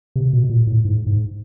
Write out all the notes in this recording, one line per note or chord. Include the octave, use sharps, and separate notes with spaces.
C3
B2
A#2
A2
G#2
G#2